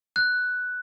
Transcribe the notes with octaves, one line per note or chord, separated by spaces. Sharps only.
F#6